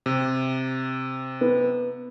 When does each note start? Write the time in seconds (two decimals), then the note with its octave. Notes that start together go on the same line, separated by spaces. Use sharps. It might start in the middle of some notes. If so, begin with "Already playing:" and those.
0.06 C3
1.41 B3